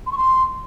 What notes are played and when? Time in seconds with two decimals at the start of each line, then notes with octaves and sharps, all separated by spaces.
0.06 C6
0.12 C#6
0.17 C6